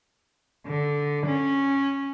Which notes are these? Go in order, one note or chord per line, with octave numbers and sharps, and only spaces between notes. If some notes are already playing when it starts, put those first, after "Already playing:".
D3
C#4